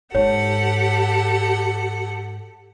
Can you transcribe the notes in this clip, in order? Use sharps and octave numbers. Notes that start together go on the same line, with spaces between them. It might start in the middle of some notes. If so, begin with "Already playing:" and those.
G#2 G4 A4 C#5 F#5